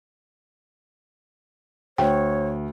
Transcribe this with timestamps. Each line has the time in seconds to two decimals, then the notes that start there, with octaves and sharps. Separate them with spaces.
1.98 D2 C#5 G5